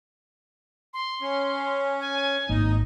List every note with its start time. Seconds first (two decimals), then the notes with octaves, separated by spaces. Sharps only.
0.94 C6
1.22 C#4
2.00 G#5
2.49 G#1 A#3 D#4